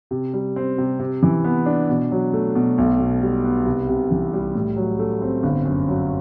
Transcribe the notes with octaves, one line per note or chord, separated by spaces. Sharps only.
C3
G3
C4
C3
C3
E3
B3
D4
B2
F#3
A3
B2
B1
B2
G3
B3
C2
C3
E3
G3
A2
F#3
A3
C4
G1
F#2
F#3